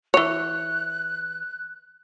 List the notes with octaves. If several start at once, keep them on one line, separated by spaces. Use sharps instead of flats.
E3 C#5 F#6